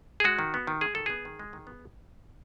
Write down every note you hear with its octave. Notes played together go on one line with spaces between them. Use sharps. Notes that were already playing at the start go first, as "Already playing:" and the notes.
G#4
G#3 F#4
D#3
B3
D#3
G#3 G#4
D#3 A4
B3 G#4
D#3
G#3
D#3
B3